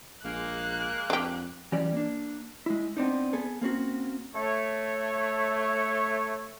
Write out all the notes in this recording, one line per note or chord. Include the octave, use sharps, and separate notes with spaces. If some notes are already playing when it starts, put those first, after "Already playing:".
A#1 G#3 A#3 F#6
F2 D4 G4
E3 F#3 G3 C#4 D5
A#3 D4
G#3 E4
B3 C4 D4 D#4
B3 G#4 A4
A#3 C4 C#4 F#4
A3 C#5